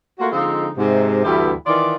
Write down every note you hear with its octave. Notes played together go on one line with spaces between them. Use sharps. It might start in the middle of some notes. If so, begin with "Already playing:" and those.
A3 A#3 F4 F#4
D3 F3 G#3 C4 D#4 F4
G#2 C3
D2 G2 E3 B3 E4 G4
D#3 E3 F4 D5